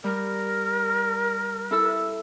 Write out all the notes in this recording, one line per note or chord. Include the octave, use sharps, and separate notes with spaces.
G3 A#4
E4 A4 E6